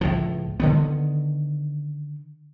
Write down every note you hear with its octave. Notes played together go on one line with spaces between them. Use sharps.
C#2 A2 F3
D3 D#3 B3